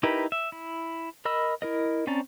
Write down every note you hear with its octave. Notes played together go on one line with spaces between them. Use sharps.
D#4 E4 G4 A#4 B4
E5
E4
A#4 D#5 B5 E6
E4 A#4 D#5
C4 C#4 D5 A5 A#5